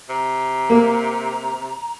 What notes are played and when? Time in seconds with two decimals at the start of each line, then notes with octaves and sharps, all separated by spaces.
0.09 C3 A#5
0.70 A#3